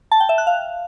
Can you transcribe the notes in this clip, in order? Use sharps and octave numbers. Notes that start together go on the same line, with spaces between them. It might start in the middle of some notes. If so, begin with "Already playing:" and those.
A5
G5
E5
F#6
F5